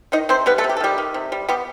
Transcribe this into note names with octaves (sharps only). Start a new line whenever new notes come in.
D#3 D#4 D#5
C3 C4 C5
G3 B3 B4
A3 A4
C3
G4
A4
D#3 G3 G4
D#3
C3
G3
G3 B3 G4